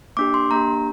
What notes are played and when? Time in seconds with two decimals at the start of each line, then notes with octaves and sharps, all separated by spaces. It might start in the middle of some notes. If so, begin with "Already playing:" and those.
0.17 A#3 D4 G4 D6
0.34 C6
0.51 A#3 D4 G4 A#5